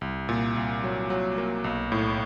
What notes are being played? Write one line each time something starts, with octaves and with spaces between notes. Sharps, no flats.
C2
A#2
C2
F#3
F#3
A#3
B1
A2